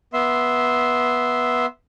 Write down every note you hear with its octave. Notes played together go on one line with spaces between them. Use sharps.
B3 E5 C6